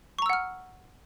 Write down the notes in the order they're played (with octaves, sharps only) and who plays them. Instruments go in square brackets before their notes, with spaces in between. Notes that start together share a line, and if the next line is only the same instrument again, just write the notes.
[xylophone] C#6
A#5
E6
F#5
F6